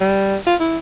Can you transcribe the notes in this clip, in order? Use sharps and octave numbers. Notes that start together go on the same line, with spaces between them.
G3
F4
E4